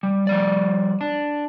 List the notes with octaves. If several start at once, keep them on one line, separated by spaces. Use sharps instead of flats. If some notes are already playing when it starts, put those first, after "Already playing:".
G3
F3 G3 D5
D4